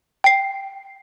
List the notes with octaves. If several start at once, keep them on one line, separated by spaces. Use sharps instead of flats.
G5 C7